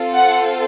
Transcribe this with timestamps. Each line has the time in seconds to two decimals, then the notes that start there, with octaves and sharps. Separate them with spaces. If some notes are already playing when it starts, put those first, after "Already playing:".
Already playing: C4 F4 A4
0.16 F#5